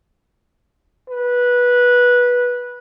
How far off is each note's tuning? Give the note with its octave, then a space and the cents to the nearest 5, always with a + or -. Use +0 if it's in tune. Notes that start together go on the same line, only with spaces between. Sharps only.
B4 -15